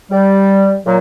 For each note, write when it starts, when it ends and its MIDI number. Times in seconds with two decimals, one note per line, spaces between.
0.11 0.75 55
0.85 0.97 46
0.85 0.97 54